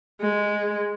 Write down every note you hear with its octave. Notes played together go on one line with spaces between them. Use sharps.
G#3